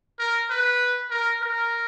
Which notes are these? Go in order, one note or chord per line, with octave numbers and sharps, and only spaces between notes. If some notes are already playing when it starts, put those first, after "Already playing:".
A#4
B4
A#4
A#4